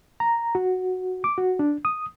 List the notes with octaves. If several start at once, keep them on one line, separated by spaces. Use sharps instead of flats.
A#5
F#4
D6
F#4
D4
D#6